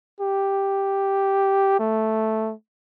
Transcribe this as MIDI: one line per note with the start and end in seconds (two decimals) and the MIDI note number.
0.20 1.79 67
1.79 2.53 57